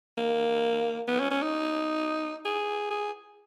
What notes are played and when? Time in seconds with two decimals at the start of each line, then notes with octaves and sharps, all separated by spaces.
0.17 A#3
1.08 B3
1.20 C#4
1.31 C#4
1.42 D#4
2.45 G#4
2.90 G#4